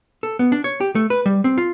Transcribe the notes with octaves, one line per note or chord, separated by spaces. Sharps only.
A4
B3
D4
C#5
G4
A3
B4
G3
C4
F4